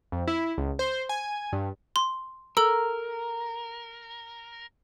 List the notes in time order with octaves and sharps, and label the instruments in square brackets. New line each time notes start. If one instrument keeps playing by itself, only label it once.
[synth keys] F2
E4
C#2
C5
G#5
G2
[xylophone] C6
[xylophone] A4 E6 [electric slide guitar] A#4